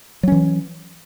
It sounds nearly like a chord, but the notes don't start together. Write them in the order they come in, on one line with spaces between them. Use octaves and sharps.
F#3 C#4 E3